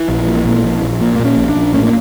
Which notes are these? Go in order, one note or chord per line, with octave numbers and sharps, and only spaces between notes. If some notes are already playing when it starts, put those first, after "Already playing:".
Already playing: E3
A#1
A#2
A#2
A#1
A#1
A#2
A#2 A#3
C#4
A#1
D4
A#1
A2 C#4
A#3